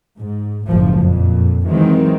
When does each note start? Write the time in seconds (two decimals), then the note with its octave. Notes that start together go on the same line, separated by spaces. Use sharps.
0.19 G#2
0.66 F#1 C#2 A2 F3
1.00 F2 A#2
1.68 D#3 E3 F#3 G#3 C4